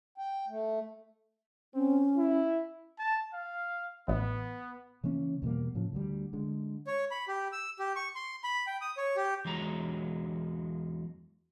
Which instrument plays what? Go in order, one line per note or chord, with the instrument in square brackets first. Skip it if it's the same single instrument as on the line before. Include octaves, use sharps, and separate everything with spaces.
[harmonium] G5
A3
[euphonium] C4 [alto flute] C#4
[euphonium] E4
[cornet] A5
F5
[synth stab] A1 [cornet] B3
[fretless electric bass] C#3 E3 A#3 C#4
E2 B2 G3 A#3
A2 C#3 F3
D2 D3 G3
D3 G#3
[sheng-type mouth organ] C#5
B5
G4
E6
G4
C#6
C6
B5
G5
D#6
C#5
G4
[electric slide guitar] E2 F#3 G#3 A#5